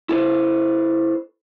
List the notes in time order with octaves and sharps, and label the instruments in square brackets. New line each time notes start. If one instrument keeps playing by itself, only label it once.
[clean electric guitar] E4 A4 B4 C5